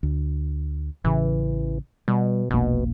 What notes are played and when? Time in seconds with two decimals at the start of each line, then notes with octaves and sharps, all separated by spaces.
0.03 D2
1.04 A1 C#3 E3
2.08 B2 G3
2.51 E1 A#1 B2 A#3